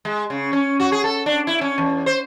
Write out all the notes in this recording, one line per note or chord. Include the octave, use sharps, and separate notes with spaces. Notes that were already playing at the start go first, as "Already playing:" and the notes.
G#3
C#3
C#4
F#4
G#4
A4
D4
E4
C#4
E2
C5